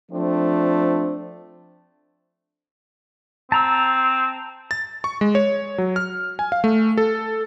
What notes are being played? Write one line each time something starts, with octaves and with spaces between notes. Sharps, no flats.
F3 A3 C4 D4
C4 A5 A#5 E6
A6
C#6
G#3
C#5
F#3
F6
G#5
F5
A3
A4